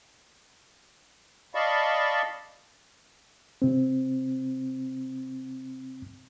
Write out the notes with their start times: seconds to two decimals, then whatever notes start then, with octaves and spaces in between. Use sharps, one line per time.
1.55 D5 D#5 F5 A5 B5 C#6
3.62 C3 C4